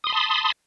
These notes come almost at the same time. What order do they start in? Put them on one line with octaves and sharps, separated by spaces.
D#6 C6 B5 A5